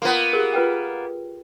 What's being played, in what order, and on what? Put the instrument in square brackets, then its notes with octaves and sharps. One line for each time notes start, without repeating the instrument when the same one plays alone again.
[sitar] A#3 B3 [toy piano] F4 C6
[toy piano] G4 G#4 A#4
F4 B4 G5